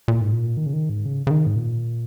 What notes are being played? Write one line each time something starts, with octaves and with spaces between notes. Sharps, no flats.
A#2
G#2
A#2
D#3
C#3
D#3
G#2
C#3
C#3
D#3
G#2
A#2